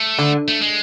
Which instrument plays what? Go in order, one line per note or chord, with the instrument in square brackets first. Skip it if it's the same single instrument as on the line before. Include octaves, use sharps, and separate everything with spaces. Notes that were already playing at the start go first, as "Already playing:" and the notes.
Already playing: [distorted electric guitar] A3
[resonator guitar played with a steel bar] D3
[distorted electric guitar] A3
G#3